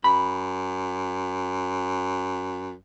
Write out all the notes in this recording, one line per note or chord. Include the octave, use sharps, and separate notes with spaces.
F#2 B5